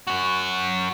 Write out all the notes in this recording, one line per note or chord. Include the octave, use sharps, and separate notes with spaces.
C#4 F#4